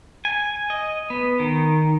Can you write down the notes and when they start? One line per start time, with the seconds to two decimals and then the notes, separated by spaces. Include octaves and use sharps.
0.25 G#5
0.70 D#5
1.10 B3
1.39 D#3